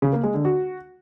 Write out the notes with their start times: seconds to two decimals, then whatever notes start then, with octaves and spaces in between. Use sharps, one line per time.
0.02 C#3
0.13 A#3
0.23 G#3
0.34 D3
0.45 F#4